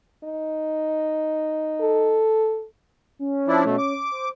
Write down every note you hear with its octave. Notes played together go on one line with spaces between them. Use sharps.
D#4
A4
C#4
F3 D4 E4
B2 A3
D6
C5